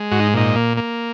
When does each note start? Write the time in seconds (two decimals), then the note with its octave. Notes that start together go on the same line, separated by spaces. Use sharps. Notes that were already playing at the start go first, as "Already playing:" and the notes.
Already playing: G#3
0.12 G#2 F#4
0.20 D#4
0.34 A#2 D#4
0.56 A#3
0.77 A#3